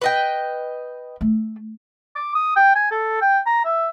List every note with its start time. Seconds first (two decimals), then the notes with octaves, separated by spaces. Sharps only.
0.02 B4 D#5 G5
1.21 A3
2.16 D6
2.35 D#6
2.56 G5
2.76 G#5
2.91 A4
3.22 G5
3.47 A#5
3.65 E5